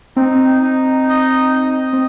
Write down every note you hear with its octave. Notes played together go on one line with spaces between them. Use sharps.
C4 D#4
D#4
D#5
D#5
C4